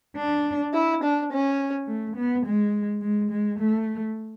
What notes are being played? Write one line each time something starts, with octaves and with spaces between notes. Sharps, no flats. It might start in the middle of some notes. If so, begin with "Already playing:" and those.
D4
E4
D4
C#4
A3
B3
G#3
G#3
G#3
A3